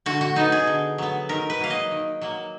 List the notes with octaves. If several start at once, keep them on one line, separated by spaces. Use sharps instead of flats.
D3 F#4
F#4
F#3 B3 D#4
G#4
D3
F#3 B3
D#3 A#4
B4
F#3 A#3 F5
D#5
D#3
F#3 A#3